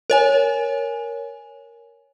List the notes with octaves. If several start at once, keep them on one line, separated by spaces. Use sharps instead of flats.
A#4 C#5 G#5